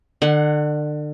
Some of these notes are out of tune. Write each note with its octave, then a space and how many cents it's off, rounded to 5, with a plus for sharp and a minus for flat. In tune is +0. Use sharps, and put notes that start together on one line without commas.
D3 +35 F#5 +0 C6 +45